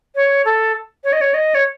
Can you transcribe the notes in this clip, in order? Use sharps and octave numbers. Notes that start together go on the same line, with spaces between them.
C#5
A4
C#5
D#5
C#5
D#5
C#5